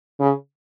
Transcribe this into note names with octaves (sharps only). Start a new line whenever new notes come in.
C#3